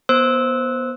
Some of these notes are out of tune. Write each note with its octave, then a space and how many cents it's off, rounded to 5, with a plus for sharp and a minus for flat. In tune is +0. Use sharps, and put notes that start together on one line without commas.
B3 -25 C5 +0 E6 -15